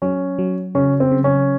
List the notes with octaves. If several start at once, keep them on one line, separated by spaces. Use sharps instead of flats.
F#3 C#4
F#3
C#3 C#4
C4
C#3
C#4